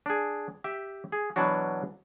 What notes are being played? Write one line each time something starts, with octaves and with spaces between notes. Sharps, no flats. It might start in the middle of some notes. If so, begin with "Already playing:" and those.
D4 G#4
G4 E5
G#4
B2 E3 F#3 D4 F#4